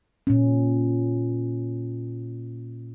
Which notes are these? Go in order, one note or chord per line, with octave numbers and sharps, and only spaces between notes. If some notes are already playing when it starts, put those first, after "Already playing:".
A#2 C#4